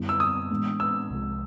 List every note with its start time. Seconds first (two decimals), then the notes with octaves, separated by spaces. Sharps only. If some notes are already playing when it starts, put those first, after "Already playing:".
Already playing: F#2 D3 G3 B3 E4
0.09 E6
0.20 D#6
0.51 A2 E3 G#3 B3 D4
0.80 E6
1.10 C2 C3 F3 G#3